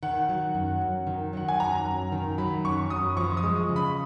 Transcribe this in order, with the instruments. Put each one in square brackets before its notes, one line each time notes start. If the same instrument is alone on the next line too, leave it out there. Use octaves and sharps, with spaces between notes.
[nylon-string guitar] D#3 [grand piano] F#5
[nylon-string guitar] F#3
F#2
F#2
D#3
[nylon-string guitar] F#3 [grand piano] F#5
[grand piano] G#5
[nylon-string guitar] F#2 [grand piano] A#5
[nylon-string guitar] F#2
D#3
[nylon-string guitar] F#3 [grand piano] B5
[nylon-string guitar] F#2 [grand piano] C#6
[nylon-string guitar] F#2 [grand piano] D#6
[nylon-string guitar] F3 [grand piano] C#6
[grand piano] D#6
[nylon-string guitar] G#3
C#3
[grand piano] B5